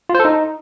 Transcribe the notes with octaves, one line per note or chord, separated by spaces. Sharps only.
F4
C5
A4
D#4